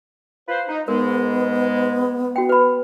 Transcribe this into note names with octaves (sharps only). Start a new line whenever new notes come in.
F4 B4 C5
D#4
G#2 G#3 B3 A#4
F#4 G5
B4 B5